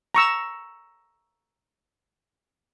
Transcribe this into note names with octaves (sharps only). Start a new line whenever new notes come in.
A#5 C#6 E6